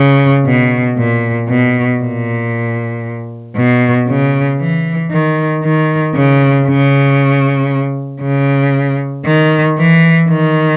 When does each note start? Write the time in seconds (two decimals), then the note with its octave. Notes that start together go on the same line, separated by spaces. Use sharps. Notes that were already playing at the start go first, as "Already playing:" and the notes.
Already playing: C#3
0.45 B2
0.97 A#2
1.48 B2
2.00 A#2
3.56 B2
4.08 C#3
4.60 E3
5.11 D#3
5.63 D#3
6.15 C#3
6.66 C#3
8.22 C#3
9.25 D#3
9.78 E3
10.29 D#3